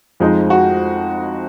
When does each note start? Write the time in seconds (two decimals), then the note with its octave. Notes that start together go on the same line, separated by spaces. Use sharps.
0.20 F2 F3 G#3 D#4
0.50 F#4